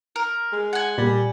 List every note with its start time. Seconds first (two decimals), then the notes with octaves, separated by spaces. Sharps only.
0.16 A#4
0.52 G#3
0.73 F#5 G#5
0.98 A#2 G3